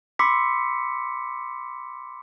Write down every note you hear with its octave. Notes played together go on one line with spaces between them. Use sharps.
B5 C6 D6 E6 B6 C#7